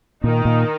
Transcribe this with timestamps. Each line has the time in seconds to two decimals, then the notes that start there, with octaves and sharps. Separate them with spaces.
0.23 A#2 D#3 D#4
0.45 A#2